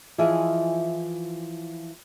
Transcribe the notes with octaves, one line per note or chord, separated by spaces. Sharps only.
E3 F3 E4 F4 G#4 D#5